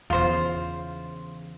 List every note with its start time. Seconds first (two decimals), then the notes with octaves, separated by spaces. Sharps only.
0.10 E2 C#3 F4 C5